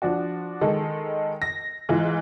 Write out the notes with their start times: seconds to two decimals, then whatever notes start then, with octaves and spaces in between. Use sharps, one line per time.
0.02 F3 D4 F#4
0.61 D#3 G#3 A4
1.42 A#6
1.89 G#2 E3 F4